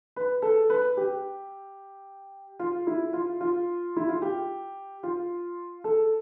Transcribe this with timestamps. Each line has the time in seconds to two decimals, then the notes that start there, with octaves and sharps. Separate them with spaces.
0.16 B4
0.42 A4
0.70 B4
0.97 G4
2.59 F4
2.87 E4
3.13 F4
3.41 F4
3.96 E4
4.09 F4
4.22 G4
5.03 F4
5.84 A4